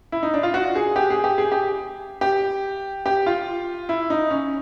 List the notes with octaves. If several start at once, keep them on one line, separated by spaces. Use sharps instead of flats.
E4
D#4
D4
F4
F#4
G#4
G4
G#4
G4
G#4
G4
G4
G4
F4
E4
D#4
C#4